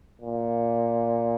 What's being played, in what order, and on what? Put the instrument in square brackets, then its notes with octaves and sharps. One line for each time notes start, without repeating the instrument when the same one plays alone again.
[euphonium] A#2